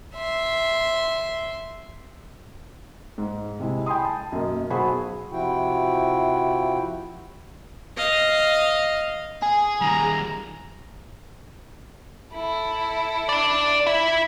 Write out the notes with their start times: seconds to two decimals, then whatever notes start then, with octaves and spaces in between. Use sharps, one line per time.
0.15 E5 C6
3.18 G#2
3.60 C3 G#3 E4
3.86 G5 G#5 B5 C6 D#6
4.05 A5
4.32 F#2 B2 A#3 D#5
4.70 B1 B3 F#4 G#4 C5 B5
5.32 C3 F3 E4 F#4 G5
7.97 D#5 F5
9.42 G#4 G#5
9.81 D#3 G3 A#5
12.34 E4 A4
13.29 D4 D5
13.87 E4